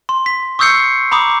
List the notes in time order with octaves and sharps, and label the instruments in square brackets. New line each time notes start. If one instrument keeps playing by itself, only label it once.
[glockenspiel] C6
B6
C#6 D#6 E6 G6 C7 C#7
A#5 B5 D6 D#6